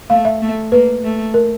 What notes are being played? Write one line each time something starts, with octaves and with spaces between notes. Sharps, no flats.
A3 F5
E5
A3
A#3 B4
A3
A#4